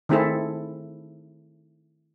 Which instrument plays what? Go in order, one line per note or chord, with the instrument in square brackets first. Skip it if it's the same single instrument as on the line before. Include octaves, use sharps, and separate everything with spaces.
[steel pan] D#3 A3 C4 E4 G#4 A4